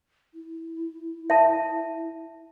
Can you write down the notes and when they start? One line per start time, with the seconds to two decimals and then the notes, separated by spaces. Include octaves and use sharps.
0.34 E4
1.30 E5 A5